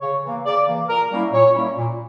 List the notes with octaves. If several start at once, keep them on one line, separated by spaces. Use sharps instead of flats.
C#3 C#5
E3 A#3
C#3 D5
E3 A#3
A#2 A#4
G3 A#3 C#4 E4
A#2 C#5
G3 A#3 C#4 E4
A#2